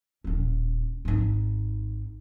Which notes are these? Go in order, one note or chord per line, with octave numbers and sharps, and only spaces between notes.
D#1 C#4
G#1 D#4